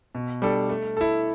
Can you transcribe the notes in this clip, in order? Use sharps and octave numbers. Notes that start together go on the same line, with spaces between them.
B2
G3 D4 A4
A3
E4 A4